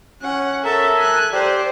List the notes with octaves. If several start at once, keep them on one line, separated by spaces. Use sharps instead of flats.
C#4 F#5
A4 A#4 E5 A5
G#5 F#6
G4 C5 D5